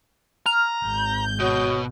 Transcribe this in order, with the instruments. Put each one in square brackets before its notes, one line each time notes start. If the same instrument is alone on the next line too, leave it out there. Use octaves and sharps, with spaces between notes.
[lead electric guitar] A#5 [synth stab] F6
[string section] G#1 G6
[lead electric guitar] B2 [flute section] F#4 C#5 D#6